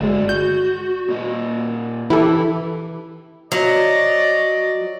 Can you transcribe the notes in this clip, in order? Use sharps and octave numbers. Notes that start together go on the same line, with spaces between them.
G1 G#3 A3 F#4 D5
F#4 G6
A#2 A#3 D#5
E3 E4 G4 A4
F#3 D5 D#5